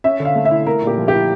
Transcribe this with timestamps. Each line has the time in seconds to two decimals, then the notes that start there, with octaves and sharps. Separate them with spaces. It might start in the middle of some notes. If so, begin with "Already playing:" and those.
0.04 C#4 E5
0.20 D3
0.25 F5
0.35 A3
0.45 E5
0.51 E4
0.67 A3 A#4
0.82 A#2
0.87 G4
0.97 F3
1.08 G4
1.14 E4